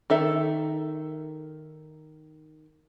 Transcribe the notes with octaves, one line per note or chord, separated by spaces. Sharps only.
D#3 A4 E5